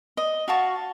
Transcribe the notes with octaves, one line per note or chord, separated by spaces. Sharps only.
D#5
F#4 F5 A5 C#6